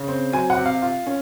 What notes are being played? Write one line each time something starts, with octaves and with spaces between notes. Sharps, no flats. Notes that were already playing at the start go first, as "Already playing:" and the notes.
Already playing: C#3
C4
F#3 G#5
F#5
C3
F5
F4
C#4